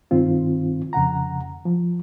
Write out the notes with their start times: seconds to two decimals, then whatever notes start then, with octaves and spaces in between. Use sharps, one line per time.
0.11 G2 D#3 C4 F4
0.93 F2 C#3 F#5 A#5
1.65 F3